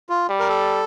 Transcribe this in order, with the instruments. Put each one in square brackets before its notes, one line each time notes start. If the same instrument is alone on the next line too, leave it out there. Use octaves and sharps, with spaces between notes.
[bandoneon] F4
[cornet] G3
[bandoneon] A#4
A4